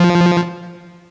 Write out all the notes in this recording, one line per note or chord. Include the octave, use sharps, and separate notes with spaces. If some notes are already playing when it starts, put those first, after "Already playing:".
Already playing: F3